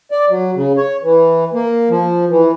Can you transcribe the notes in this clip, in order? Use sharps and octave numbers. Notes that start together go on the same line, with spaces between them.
D5
F#3
C#3
C#5
E3
A#3
F3
E3